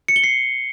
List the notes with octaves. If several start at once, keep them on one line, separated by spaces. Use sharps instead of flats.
C#7
G7
C7